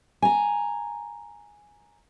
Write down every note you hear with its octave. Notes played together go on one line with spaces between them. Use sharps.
G#5 A#5